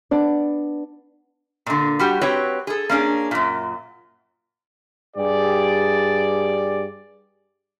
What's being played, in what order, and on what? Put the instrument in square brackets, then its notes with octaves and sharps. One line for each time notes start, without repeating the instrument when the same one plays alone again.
[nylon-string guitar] B3 D4 D5
[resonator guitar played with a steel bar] A#2 D3
G3 F#4 G4
C4 F#4 G4 B4 C#5
G#4 A4
A#3 C#4 D4 G#4
F#2 A#2
[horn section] G2 G4 G#4 D5